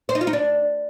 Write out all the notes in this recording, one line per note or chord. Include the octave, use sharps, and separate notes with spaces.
C5
D#4
F4
D#4
D4